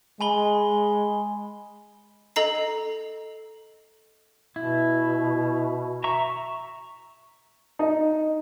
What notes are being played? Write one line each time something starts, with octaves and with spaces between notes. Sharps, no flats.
G#3 G#5 B5 G7
A4 D#5 A#5 C7
B2 E4
E5 A#5 C#6
D#4